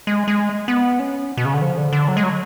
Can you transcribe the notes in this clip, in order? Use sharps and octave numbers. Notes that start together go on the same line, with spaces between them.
G#3
G#3
B3
C#4
B2
C#3
D3
F3
D3
D3
F#3
G#3
F#3